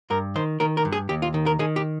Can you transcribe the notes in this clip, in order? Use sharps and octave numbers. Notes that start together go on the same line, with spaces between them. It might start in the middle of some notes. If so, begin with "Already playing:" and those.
G2 A#4
D#3 C5
D#3 A#4
A#4
G2
G#4
D#2 G4
F4
D#3
A#4
D#3 G#4
G4